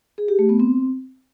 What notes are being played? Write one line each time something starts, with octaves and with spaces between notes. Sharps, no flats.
G#4
G4
A3
B3
C4